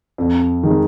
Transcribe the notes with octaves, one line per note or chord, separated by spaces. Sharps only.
F2
D#3 G#3